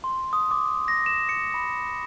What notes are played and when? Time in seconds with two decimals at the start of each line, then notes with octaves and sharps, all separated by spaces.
0.04 C6
0.33 D#6
0.51 D6
0.88 A#6
1.06 E7
1.29 C#7
1.54 B5